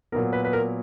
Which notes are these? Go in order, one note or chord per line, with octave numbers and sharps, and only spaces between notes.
A#2 F#3 B3 A#4
B4
B4
A#4